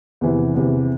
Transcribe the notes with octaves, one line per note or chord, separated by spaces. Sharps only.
E2 C3 E3
E2 C3 E3